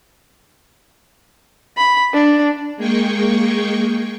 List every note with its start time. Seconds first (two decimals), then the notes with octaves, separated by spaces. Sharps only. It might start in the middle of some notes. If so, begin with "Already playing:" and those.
1.77 B5
2.14 D4
2.76 G#3 A#3 G#4 G5 C#6